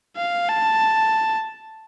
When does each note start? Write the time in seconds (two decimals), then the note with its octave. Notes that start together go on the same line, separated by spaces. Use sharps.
0.17 F5
0.49 A5